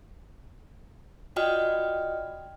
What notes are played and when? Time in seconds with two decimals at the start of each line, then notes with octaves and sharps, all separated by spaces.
1.36 F4 F#4 D5 D#5 G5 F6